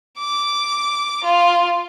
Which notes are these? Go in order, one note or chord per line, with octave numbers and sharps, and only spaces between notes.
D6
F4